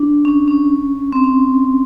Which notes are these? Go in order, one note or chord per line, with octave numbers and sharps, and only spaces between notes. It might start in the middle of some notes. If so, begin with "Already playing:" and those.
Already playing: D4
C#4
C#4
C4
C#4